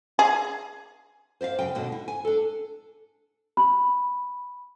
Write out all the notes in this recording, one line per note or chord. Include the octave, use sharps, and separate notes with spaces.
G#4
C5 D5 E5 F5
F#2 C#3 G5
D#2 B2 D3
E4
G#5
D4 A4
B5